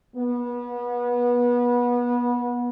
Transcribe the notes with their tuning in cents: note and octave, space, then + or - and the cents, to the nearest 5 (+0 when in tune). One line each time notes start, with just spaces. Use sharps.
B3 -25